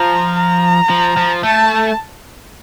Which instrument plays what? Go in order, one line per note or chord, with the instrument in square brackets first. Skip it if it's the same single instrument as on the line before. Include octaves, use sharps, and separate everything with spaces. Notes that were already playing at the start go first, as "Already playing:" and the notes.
Already playing: [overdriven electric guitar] F3 [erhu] A#5
[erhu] A#5
[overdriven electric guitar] F3
F3
[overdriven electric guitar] A3 [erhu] A5